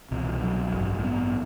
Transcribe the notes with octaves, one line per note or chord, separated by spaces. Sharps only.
C2 B2 E3
E3
F#3
A1 G2
A3
B3